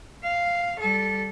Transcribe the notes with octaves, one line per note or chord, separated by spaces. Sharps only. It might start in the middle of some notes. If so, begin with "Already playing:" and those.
F5
G3 A4